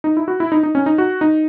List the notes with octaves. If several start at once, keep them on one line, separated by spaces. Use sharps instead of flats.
D#4
E4
F#4
E4
D#4
D#4
C#4
D#4
F#4
D#4